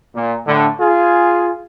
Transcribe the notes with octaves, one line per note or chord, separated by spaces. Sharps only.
A#2
A2 D3
F4 G#4